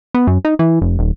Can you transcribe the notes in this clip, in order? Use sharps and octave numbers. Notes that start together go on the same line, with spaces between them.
B3
F#2
D#4
E3
F1
D#1